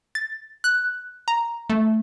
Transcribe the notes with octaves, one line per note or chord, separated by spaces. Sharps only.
A6
F#6
A#5
A3